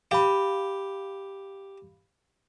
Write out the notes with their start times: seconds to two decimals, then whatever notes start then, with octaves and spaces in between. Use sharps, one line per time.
0.11 G4 F5 B5